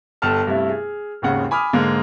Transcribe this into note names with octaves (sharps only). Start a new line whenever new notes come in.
G1 G4 A4 A5 F6
G2 C3 A3 E4
G#4
G#1 D#2 C#3 F#5
G#5 B5 D6 D#6 F6
G#2 D3 G#3 A#3